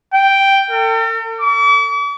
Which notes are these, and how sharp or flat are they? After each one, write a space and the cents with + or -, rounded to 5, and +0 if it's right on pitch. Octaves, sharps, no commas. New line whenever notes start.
G5 +0
A4 +45
D6 -45